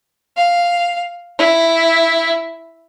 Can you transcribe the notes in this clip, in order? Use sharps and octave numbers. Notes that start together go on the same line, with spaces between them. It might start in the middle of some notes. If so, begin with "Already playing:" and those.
F5
E4